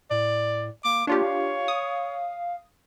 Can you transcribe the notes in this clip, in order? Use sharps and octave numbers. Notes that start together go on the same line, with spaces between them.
A2 D5
A#3 D6
A#3 D4 F4 G4 C#5
F5
D#6